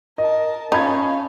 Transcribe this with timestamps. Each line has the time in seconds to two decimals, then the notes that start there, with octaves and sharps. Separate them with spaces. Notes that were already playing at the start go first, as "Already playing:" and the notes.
0.18 A#4 D#5 A5
0.72 C#4 D#4 F5 A5 B5 G#6